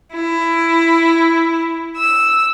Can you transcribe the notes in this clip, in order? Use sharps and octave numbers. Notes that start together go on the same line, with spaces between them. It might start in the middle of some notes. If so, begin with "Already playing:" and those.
E4
E6